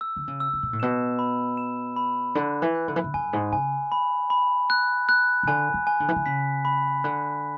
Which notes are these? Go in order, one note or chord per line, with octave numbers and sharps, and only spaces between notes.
E6
D3
C#3
E6
C#3
B2
A2
B2 E7
B5
E7
B5
D3 F#6
E3
F#6
D3
E3
D3
F#2 G#5
G#2
C#3 G#5
B5
B5
F#6
F#6
C#3
D3 G#5
E3
G#5
D3
E3
D3
C#3 B6
B5
D3 F#6